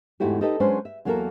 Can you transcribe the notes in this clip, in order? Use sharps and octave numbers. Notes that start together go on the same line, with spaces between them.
E2 G#2 A3 E4 F#4 G4
D#4 G4 A4 B4 D#5
F#3 G#3 C#4 D4 B4 C5
E5
E2 F#3 A#3 F#4 A4 A#4